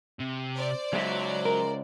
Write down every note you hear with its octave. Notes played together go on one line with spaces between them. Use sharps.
C3
C5 D5
C#3 F#3 G#3 E5
A#4